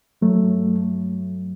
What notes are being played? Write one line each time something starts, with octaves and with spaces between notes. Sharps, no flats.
G2 F#3 A3